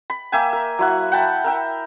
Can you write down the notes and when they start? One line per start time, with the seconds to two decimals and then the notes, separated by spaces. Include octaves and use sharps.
0.10 B5
0.32 A#3 E5 G5 G#5
0.53 A#4
0.79 F#3 E4 F#5
1.12 F#5 G5 A5 B5
1.44 A#4 E5 G5